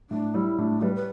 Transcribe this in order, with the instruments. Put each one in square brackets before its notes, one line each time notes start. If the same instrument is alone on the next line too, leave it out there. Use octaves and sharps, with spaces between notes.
[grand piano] A2 [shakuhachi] D4
[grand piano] G3 [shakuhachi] E4
[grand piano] A2 [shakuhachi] D4
[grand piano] G3 [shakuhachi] B4
[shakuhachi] B4